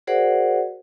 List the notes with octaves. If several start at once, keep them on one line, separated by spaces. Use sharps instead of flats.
F#4 G#4 A#4 C5 D5 F#5